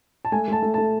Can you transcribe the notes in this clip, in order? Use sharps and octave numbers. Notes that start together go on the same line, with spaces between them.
A5
A3 G#5
A3 A5
A3
A5
A3